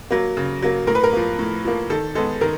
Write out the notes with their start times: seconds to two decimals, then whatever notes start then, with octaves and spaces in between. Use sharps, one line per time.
0.11 F#3 A#3
0.37 C#3
0.62 F#3 A#3
0.87 A2 A#4
0.95 B4
1.04 A#4
1.13 F3 A#3
1.39 A2
1.65 F3 A#3
1.90 D#3 A4
2.15 G#3 B3 A4
2.41 D#3 A#4